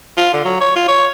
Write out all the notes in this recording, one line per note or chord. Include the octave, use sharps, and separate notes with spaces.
F4
D3
F#3
C#5
F4
C#5